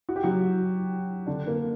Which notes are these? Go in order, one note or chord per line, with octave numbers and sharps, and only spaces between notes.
F#4
G4
F#3 F#4
D3 D4
A#3